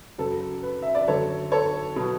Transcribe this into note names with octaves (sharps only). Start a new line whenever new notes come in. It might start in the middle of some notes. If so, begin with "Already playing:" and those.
F#2 C#3 F#3 A4
B4
E5
D5
F#2 D3 F#3 A4 C#5
A4 C#5
B2 F#3